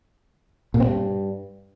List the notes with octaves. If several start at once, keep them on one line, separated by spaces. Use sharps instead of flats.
A#2
C4
G2